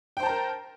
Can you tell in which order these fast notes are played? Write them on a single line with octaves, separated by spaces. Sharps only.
G5 C5 A5 A#5 A#4